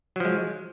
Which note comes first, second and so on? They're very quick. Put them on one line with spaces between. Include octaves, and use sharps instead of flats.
F#3 F3 G#3